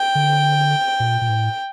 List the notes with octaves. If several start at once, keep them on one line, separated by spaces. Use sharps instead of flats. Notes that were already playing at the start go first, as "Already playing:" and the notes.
Already playing: G5
D3
A#2
A#2
A2